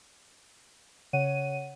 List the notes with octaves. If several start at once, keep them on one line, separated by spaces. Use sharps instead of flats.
C#3 C#5 F#5 D#7